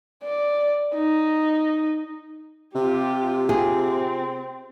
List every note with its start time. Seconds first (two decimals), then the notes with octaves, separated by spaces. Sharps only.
0.23 D5
0.94 D#4
2.75 C3 F4 G4
3.49 C4 F4 G#4